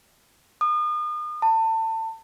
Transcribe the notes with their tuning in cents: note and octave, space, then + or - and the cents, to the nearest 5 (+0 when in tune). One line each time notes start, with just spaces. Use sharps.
D#6 -35
A5 +30